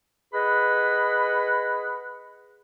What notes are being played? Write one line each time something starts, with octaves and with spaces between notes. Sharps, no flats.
G#4 B4 D#5 F#5 B5